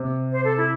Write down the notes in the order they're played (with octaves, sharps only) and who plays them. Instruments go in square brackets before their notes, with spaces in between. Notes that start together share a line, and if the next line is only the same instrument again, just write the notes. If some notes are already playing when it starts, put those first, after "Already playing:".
Already playing: [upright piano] C3
[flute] C5
A4
E4